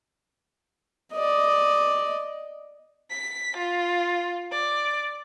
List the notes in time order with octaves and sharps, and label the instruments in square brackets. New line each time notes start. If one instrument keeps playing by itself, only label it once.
[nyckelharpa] D5 D#5
[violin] B6
F4
D5